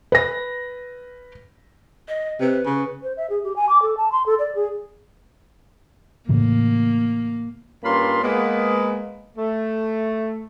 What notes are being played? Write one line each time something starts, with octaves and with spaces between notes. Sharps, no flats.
B4 A#6
D#5
C3 B4
C#3
C5
E5
G#4
G4
G#5
D6
A4
A5
C6
A4
D5
G#4
A2 C#3 E3 A#3
G2 A#3 C#4 F4 B5 C6
G#3 A#3 B3
A3